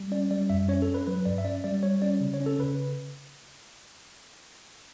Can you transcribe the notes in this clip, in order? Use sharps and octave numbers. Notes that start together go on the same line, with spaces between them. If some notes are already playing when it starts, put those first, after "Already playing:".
Already playing: G3
C#4 D5
G3 D5
F#2 E5
C#4 C#5
A4
C#4
B4
F#3 B4
G2 D5
E5
C#4 D5
G3 D5
G3 C#5
C#4 D5
C#3
C#5
C#4
A4
C#3 B4